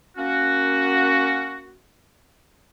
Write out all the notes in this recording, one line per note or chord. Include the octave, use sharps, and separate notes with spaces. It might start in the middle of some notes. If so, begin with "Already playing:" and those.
A#3 C#4 F#4